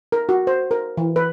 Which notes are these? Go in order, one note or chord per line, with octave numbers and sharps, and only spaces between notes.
A#4
F#4
C5
A#4
E3
B4